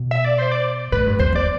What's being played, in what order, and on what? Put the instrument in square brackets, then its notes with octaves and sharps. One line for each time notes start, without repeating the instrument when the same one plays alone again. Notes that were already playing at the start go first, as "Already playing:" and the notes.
Already playing: [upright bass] B2
[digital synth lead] E5
D5
C5
D5
[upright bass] A2 [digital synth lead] B4
[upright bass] G2
[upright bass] E2 [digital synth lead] C5
[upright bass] E2 [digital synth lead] D5